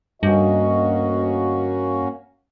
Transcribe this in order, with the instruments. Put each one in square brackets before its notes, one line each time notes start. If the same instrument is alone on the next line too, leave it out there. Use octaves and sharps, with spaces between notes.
[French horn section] D2 D#5 [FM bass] G2 [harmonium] A#3 C#4 F#4